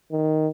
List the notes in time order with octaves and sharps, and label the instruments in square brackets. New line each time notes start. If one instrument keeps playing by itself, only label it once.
[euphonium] D#3